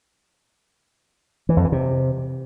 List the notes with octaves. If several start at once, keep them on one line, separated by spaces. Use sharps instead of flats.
E3
F2
E3
C3